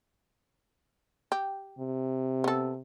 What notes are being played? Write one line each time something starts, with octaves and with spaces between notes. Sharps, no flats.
G4
C3
B3 A4